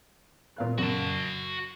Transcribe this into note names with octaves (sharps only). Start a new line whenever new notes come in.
A#2 F5 F#6
F#2 F#4 A5